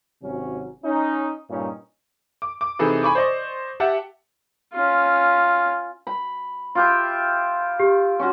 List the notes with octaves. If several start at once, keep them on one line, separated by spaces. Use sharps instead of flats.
G#1 C3 F#3 C#4
C#4 D#4
G2 A#2 C#4 D#4
D6
D6
C3 E3 D#4 G#4 A4 B4
G#5 B5 C#6 D6
C5 D5 D#5 C#6
G4 E5 F#5 A5
C#4 F4
B5
F4 G4 E5
G4
C#4 F4 F#4